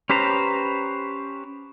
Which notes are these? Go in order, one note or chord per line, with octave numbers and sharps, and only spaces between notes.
C#4 G4 B4 C5 A#5